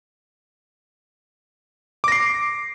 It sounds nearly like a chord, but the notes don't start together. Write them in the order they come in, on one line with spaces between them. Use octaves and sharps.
D6 A#6 C7